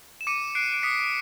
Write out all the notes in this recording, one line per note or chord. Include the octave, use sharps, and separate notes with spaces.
E7
D6 C#7 D#7
F#6 C7 D7
D7
D#6 B6 C#7